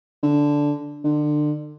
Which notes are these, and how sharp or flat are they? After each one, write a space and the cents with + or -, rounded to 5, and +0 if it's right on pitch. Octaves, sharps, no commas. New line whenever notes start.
D3 -5
D3 +30